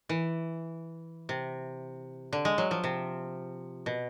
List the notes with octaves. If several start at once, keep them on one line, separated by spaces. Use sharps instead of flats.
E3
C3
D3
G#3
F#3
F3
C3
B2